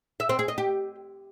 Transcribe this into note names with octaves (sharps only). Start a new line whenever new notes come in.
E5
C4
G#4
D#5
G4